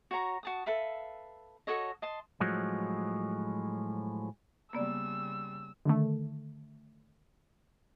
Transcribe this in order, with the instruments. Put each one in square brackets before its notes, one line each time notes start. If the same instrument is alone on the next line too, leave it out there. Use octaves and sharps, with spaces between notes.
[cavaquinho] F#4 C#5 A#5 C#6
F#4 A5 D#6
A4 B4 E5 F5
F#4 A4 C#5 D#5
D#5 A5 C6
[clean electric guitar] A2 F3 F#3 G#3 F#4
[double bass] C#3 G3 [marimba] A#3 B3 D5 [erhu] E6
[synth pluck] D3 D#3 A3